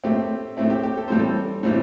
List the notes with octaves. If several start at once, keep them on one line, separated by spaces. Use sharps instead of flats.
A2 A3 C4 G4
A2 A3 C4 E4
G4
G4
A4
A2 E3 G3 C4 C5
A4
A2 E3 G3 C4